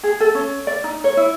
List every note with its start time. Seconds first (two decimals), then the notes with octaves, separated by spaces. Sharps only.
0.03 G#4
0.20 A4
0.35 C#4
0.67 D5
0.84 D#4
1.04 C#5
1.17 E4